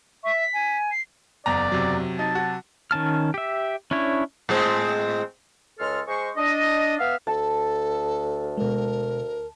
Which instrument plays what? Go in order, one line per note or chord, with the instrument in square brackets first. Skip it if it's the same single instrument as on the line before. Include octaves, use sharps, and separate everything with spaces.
[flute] E5 [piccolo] C#6
[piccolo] B6
[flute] G#5
[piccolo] C7
[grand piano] F#1 E2 A#5 [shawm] D5
[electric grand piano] C3 F#3
[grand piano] D#4 [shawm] A5
[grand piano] F#4
[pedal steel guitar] D#3 C#4 A5 F6
G4 E5
C#4 D4 E4 C#5
[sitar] A2 G#3 C4
[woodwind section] C#2 G#3 A4 C#5 C6 F6
G#3 C5 C#6
D4 D#5
B3 E5 F5
[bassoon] D2 [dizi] A4 [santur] A5
[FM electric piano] B2 G#3 [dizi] A#4